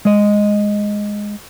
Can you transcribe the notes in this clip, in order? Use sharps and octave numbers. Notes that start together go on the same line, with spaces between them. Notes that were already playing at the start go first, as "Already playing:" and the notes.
G#3 D#5